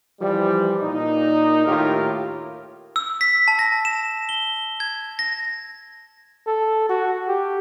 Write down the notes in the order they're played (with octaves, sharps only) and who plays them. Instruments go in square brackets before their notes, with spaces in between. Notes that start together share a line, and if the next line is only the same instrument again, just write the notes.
[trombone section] E3 F3 G3
A#2 D#4
D#2 A2 F4 G4 A#4
[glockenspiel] E6
B6
A5
A#6
E7
G7
G#6
A#6
[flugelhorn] A4
F#4
G4